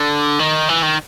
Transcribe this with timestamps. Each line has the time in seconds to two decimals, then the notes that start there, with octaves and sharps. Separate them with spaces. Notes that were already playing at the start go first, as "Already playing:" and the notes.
Already playing: D3
0.39 D#3
0.69 E3
0.83 D#3